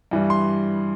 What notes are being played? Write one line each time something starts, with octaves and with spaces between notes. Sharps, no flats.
G2 E3 G3
C6